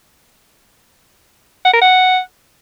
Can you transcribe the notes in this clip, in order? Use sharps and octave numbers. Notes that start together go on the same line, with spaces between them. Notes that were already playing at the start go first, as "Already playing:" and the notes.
F#5
A#4
F#5